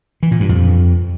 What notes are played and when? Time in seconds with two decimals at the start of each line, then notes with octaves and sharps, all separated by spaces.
0.23 E3
0.31 A#2
0.40 G2
0.49 F2